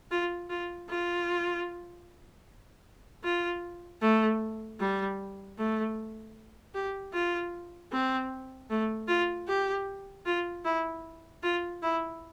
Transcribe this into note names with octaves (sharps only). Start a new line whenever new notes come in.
F4
F4
F4
F4
A3
G3
A3
G4
F4
C4
A3
F4
G4
F4
E4
F4
E4